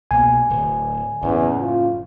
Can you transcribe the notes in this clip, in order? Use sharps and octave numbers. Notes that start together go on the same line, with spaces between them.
C2 B2 A#3 G#5
D1
F#1 E2 A2 C#4
F4